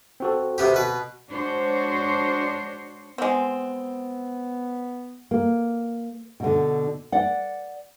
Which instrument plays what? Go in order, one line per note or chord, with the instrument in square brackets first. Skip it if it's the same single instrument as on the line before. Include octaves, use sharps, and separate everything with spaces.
[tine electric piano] C4 F#4 A4
[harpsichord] C3 B3 G4
B2 B4
[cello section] G#3 D4 F#4 C5 C#5
[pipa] G#3 C4 [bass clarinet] B3
[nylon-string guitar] A#3
B2 D3
D5 F#5